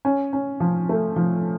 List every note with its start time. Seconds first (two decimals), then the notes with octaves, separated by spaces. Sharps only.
0.05 C#4
0.33 C#4
0.60 F3
0.89 A3
1.16 F3